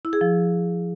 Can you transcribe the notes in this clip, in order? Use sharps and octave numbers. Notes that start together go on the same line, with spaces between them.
E4
G#4
F3